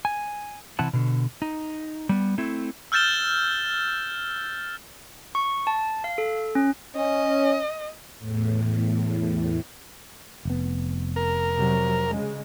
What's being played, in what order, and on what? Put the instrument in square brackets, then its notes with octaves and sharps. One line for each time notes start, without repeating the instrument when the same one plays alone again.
[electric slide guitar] G#5
C3 E3 E4 F#5 A5
B2 D3
D#4
G3 B3
A3 C4 E4
[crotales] E6 F6 G6 A6 E7 G7
[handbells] C#6
A5
F5
A4
C#4
[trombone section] C#4 [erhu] D#5
[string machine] E2 A2
[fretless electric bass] F1 B3
[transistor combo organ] A#4
[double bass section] C3 F#3
C#3 G#3